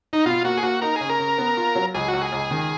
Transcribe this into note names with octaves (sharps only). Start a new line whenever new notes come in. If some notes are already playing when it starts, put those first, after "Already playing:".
D#4
B2 F4
A#3 F#4
G#4
A#3 F#4
D#4 A#4
C#3 G#4
A#4
C#3
B3
F4
F#3
C#2 G#4
C#2 F#4
G#4
C#2
D#3